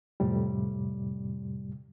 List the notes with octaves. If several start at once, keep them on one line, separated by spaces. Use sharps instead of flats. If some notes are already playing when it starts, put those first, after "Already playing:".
F2 A2 C3 G3